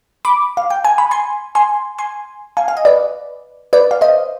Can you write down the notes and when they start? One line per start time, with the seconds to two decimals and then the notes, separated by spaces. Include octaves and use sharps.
0.25 B5 D6
0.57 F5
0.70 G5
0.85 G#5
0.98 B5
1.11 G#5 C6
1.55 G#5 C6
1.98 G#5 C6
2.57 F5 G#5
2.68 F5
2.77 D#5
2.85 B4 D5
3.73 B4 D5
3.91 F5
4.01 C5 D#5